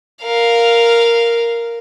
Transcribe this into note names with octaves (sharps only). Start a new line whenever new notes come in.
A#4 F5